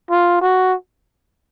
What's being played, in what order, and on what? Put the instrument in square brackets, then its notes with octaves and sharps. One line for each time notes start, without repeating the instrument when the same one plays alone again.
[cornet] F4
F#4